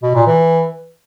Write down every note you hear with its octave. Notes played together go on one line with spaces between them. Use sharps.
B2
A#2
E3